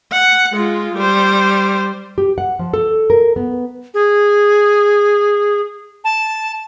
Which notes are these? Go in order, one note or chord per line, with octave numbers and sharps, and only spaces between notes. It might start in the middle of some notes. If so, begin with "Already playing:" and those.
F#5
G#3 F4
G3 C5
G4
F#5
F3
A4
A#4
B3
G#4
A5